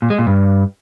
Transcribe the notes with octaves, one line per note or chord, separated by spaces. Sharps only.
A#2
G#3
A#2
G2